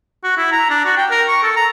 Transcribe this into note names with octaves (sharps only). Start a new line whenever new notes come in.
F#4
E4
A#5
D4
F#4
G5
A#4
C#6
A4
A#5